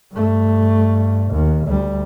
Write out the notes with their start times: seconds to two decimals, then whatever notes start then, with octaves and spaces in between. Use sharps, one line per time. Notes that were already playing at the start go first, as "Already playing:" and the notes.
0.12 G2 A3
1.31 D#2
1.67 D2 G3